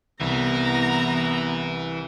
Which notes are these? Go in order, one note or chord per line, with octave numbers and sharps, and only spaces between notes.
C2 E3 B3 A#5